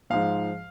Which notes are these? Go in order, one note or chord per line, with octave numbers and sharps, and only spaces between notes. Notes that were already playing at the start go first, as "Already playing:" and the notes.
G#2 F3 F5